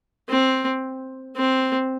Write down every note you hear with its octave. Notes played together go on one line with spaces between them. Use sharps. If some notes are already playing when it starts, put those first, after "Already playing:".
C4
C4